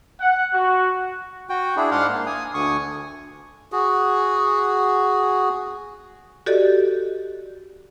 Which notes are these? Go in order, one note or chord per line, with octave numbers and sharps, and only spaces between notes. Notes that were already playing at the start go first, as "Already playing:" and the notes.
F#5
F#4
F#4 G5
D4 E4 G#4
G#2 D4 F5 F#5 C6
A#3
G#5 D#6
D2 D3 G#5 C#6 D#6
F#4 G#4
F#4 G4 A4 D5 D#5